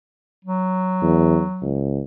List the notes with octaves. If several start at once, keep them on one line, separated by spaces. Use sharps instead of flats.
F#3
E2
C#2